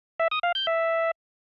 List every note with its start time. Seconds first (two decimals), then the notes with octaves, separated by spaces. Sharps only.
0.20 E5
0.31 D#6
0.43 F5
0.55 G6
0.67 E5